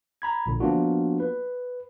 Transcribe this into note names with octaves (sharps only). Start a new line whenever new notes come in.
A#5 B5 G#6
A#1 A#2 D3
F3 A#3 B3 D4 F4 F#4
B4